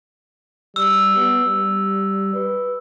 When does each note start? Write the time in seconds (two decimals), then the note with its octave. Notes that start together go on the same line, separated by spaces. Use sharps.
0.76 G3 E6
1.15 B3
1.44 G3
2.34 B4